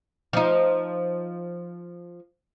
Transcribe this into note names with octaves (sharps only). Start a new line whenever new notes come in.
F3 D#4